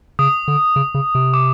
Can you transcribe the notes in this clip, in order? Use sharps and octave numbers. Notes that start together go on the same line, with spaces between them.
C#3 D#6
D3
C#3
C#3
C3
D6